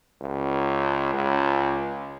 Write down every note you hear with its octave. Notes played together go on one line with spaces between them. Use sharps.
C#2
C#2